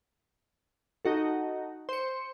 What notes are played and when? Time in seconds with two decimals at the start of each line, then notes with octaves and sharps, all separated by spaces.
1.05 D#4 F#4 A4
1.89 C5 C#7